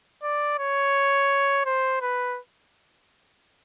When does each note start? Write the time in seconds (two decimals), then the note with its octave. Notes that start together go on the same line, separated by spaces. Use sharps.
0.23 D5
0.59 C#5
1.66 C5
2.02 B4